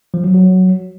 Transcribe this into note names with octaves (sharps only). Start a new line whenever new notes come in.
F3
F#3
F#3